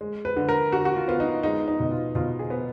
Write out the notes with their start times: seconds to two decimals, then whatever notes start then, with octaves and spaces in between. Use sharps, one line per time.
0.01 G#3
0.25 B4
0.36 D3
0.49 A#4
0.72 D3 F#4
0.85 F#4
0.96 F4
1.08 B3 F4
1.20 D#4
1.43 G#3 D#4
1.68 D#4
1.80 B2
1.91 F4
2.15 B2 F4
2.39 G#4
2.50 B3